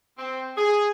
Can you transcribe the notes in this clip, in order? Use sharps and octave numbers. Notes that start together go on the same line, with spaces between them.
C4
G#4